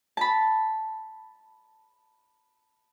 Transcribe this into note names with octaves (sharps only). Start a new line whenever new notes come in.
A5 B5